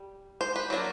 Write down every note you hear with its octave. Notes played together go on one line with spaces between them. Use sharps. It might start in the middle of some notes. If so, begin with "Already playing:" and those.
Already playing: G3
C5
B4
F#3 A#3 D4